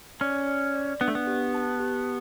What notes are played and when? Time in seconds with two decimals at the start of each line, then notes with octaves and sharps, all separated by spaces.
0.21 C#4 D5
0.48 D5
0.74 D5
1.01 B3 D4
1.08 A3
1.15 B3
1.27 G4
1.54 A5
1.80 G4